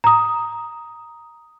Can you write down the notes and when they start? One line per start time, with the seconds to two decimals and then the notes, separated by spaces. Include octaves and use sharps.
0.04 A#5 D#6